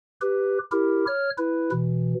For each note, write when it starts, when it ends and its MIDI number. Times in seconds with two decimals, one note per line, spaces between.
0.21 0.59 67
0.21 0.59 71
0.72 1.05 64
0.72 1.05 67
0.72 1.05 70
1.07 1.30 73
1.07 1.30 89
1.38 1.71 64
1.38 1.71 71
1.72 2.14 47
1.72 2.14 52